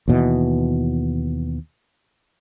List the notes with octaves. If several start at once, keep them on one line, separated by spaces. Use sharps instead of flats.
D#2 B2 E3